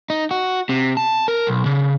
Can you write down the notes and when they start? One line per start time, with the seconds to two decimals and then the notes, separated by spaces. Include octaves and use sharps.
0.10 D#4
0.31 F#4
0.69 C3
0.97 A5
1.28 A#4
1.47 B1
1.66 C#3